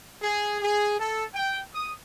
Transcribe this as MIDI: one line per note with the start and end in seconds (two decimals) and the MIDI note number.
0.21 0.60 68
0.60 0.96 68
0.98 1.23 69
1.32 1.58 79
1.72 1.91 87